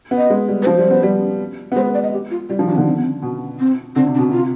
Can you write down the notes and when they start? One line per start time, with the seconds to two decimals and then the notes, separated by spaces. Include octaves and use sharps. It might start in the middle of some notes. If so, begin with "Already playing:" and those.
0.11 B3
0.18 D#5
0.30 G#3
0.48 G3
0.63 B4
0.66 F3 C5
0.78 G3
0.91 B3
1.03 G3
1.72 B3
1.76 G#3 C5
1.85 B4
1.94 D5
2.03 D#5
2.13 G4
2.31 F4
2.49 G3 F4
2.59 F3 D#4
2.67 D#3 D4
2.76 D3 B3
2.86 C4
2.96 B3
3.04 C4
3.22 B2
3.59 C4
3.96 D3 C4
4.07 C3
4.14 D4
4.18 B2
4.29 C3 F4